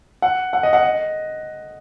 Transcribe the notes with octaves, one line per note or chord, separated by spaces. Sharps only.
F#5
F#5
D#5
F#5
D#5